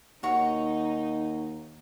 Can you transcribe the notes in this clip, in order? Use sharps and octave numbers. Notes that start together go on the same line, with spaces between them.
D#2 D#4 F#4 C#5